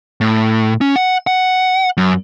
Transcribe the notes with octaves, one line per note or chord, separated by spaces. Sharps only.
A2
C#4
F#5
F#5
F#2